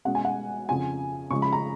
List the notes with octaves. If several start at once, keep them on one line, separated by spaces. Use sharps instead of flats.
B2 G#3 C#4 F#5
G#5
F#5
F2 C#3 F3 G#5
C#3 F3 G#3 C#6
B5
A#5